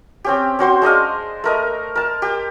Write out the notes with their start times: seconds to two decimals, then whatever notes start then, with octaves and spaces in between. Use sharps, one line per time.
0.24 C4 C#4 G4
0.59 C#4 F#4 C5 C6
0.82 G#3 D4 D#5 F5
1.44 A3 A#4 D#5
1.95 A#4 A5
2.22 G4